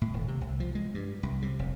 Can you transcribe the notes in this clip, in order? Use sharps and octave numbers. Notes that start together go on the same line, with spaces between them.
A2
D#1
C3
C2
F3
G#3
G2
C2
C3
F1